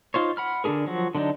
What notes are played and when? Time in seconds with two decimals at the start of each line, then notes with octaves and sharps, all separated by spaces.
0.14 D#4 F4 C5 C#5
0.37 F#5 B5 F6
0.64 D3 D4 G4 G#4 A#4
0.87 F3 F#3 F#4
1.15 D3 F#3 D4 D#4